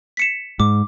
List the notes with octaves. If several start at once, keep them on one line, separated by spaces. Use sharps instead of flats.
B6 C#7 E7
G#2 D6